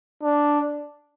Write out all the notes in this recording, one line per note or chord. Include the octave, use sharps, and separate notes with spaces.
D4